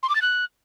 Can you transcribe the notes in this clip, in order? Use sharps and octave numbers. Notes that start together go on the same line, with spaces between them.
C6
D6
A6
F#6